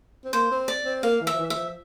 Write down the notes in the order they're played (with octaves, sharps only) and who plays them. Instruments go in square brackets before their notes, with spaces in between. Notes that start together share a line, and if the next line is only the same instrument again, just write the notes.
[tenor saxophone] C4
[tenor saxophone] A#3 [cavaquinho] C5
[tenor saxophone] C4
[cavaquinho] D5
[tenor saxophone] C4
[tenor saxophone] A#3 [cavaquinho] F5
[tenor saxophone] E3
[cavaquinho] E5
[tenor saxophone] F3
E3
[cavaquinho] E5
[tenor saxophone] F3